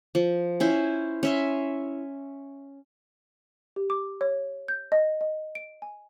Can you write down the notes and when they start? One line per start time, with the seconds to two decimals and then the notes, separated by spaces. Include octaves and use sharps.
0.15 F3
0.60 C#4 E4 C5
1.23 C#4 E5 C6
3.76 G4
3.90 D6
4.21 C#5
4.68 G6
4.92 D#5
5.21 D#5
5.55 D7
5.82 G#5